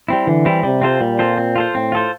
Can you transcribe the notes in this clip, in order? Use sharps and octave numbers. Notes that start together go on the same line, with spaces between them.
G3 C4 E4
D3 E3
G3 C4 E4
C3 G3
C4 F4 A4 C5
A#2 G3
C4 F4 A4 C5
C4
F4 A4 C5
A2 C4
F4 A4 C5